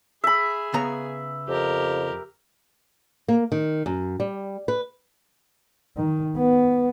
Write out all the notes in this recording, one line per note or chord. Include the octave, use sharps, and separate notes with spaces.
G#4 E5 B5
C#3 B3 A#5
F2 G4 A#4
A#3
D#3
F#2
G3
B4
D#3
B3